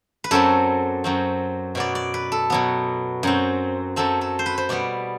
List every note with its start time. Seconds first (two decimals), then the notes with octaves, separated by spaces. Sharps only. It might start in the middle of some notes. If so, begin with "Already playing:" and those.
0.24 B4
0.31 F#2 F#3 C4 A4
1.04 F#2 F#3 C4
1.75 B2 F#3 B3 D5
1.95 D5
2.14 B4
2.32 A4
2.50 B2 F#3 B3
3.23 F#2 F#3 C4
3.96 F#2 F#3 C4 A4
4.21 A4
4.39 C5
4.46 B4
4.58 C5
4.69 B2 G3 B3 D5